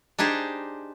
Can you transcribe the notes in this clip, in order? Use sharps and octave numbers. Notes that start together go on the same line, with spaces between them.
D4 D#4 G4 G#4 C5